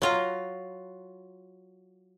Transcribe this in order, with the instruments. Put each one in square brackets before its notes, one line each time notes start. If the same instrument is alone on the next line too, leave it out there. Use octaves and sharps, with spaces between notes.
[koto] F#3 F4 A#5